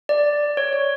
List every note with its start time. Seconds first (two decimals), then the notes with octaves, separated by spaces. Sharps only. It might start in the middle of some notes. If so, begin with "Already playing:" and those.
0.09 D5
0.57 C#5
0.73 C#5